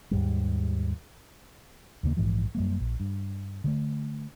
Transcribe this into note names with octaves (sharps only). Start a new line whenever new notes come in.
D#2 G#2 G3
D#2 C#3 A#3
A#1 G#2 E3 F3
F#2 G3 A#3
A#1
G2
D3 F3 A3